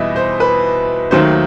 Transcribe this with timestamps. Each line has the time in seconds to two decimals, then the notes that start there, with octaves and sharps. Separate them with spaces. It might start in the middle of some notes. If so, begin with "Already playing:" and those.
Already playing: E2 B2 G3 D#5 E5
0.16 C5
0.40 B4
1.11 D#2 D#3 F#3 A3 C5